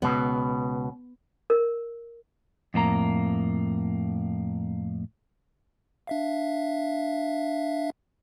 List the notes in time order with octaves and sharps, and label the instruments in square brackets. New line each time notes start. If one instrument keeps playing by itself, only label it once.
[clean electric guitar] C#2 B2 [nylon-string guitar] B3
[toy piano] A#4
[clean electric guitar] F2 A2 A#3 A#5
[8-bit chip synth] D4 E5 F5